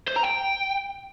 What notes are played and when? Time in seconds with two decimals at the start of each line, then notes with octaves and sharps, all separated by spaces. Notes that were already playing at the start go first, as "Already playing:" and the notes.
0.08 C5
0.16 A#5
0.24 G5